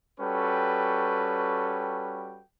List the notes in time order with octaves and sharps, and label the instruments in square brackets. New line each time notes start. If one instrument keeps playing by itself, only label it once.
[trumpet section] G3 C#4 F#4 A4 B4 G5